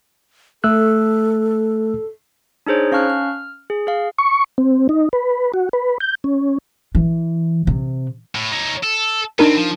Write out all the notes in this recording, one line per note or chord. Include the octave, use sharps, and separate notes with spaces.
A3 A4 E6 F#6
D4 D#4 G#4 C5 C#5
C#4 F5 A5 C#6 F6 F#6
F6
G#4
G#4 F5
C#6
C4
D#4
B4
F#4
B4
G6
C#4
E3
C3
A2
D#4 C#5
A4
B3 C4 D4 D#4 A#4
F3